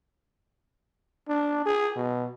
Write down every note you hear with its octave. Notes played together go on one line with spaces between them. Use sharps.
D4
G#4
B2